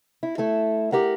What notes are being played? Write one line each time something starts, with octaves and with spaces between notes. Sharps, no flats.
E4
A3 E4 A4
G4 A#4 F#5